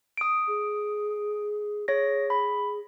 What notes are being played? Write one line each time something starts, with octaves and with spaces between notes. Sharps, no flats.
D#6 D7
G#4
G#4 C#5 A#6
B5